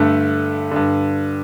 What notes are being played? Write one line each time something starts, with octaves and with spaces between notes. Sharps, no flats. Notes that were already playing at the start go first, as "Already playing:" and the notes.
Already playing: G2 D3 A3
G2 D3